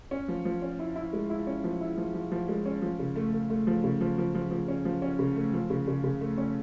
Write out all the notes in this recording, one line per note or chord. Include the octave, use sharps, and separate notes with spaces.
C#4
F3
F3
C#4
E4
E4
G#3
E4
C#4
F3
E4
F3
F3
F3
G#3
C#4
F3
C#3
A3
A3
A3
F3
C#3
F3
F3
F3
F3
C#4
F3
C#4
C#3
A3
F3
C#3
C#3
C#3
A3
C#4